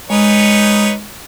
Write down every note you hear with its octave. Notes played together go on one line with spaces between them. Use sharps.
G#3 D#4 B4 C#5